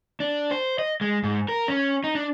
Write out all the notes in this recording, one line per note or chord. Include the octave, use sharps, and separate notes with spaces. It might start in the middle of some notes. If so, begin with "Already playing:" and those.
D4
C5
D#5
G#3
G#2
A#4
C#4
D#4
D4